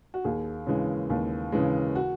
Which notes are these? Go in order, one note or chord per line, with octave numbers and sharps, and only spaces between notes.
F#4
D#2 G#4
C#3 E3 G#3
D#2
C#3 E3 G#3
F#4